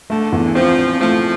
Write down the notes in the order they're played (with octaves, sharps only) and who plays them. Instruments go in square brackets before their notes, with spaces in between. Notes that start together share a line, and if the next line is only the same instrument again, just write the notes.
[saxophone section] D3 [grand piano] A3
[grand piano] E2
[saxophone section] E3
[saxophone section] F3 [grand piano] C4
[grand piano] C4
[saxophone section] F3 [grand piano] A3